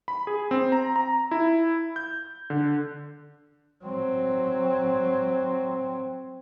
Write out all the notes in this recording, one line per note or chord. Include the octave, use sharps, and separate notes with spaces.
B5
G#4
C4
A#5
A#5
E4
G6
D3
F#3 C4